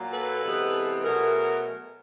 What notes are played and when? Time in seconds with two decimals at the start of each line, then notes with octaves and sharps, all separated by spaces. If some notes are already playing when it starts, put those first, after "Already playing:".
Already playing: A#2 F#3 A#3
0.12 A4 B4
0.43 C3 E3 G#3 B3
1.03 B2 F#3 A3 G#4 A#4